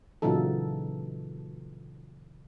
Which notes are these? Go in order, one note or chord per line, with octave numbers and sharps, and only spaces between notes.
A#2 C#3 E3 F#3 D#4 A4